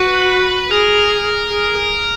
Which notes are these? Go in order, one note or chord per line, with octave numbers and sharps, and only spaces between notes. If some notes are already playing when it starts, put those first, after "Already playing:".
Already playing: F#4 B4
G#4 A#4
G#4